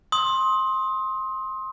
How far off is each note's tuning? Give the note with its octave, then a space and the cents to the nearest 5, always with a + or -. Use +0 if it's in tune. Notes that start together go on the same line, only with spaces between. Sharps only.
C6 +15 D#6 +25